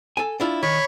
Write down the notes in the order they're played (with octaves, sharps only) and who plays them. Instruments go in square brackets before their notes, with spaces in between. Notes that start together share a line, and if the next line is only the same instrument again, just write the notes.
[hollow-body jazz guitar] A4 G#5
D4 E4 F4
[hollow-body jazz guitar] D#3 [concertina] C#5 B5 C#6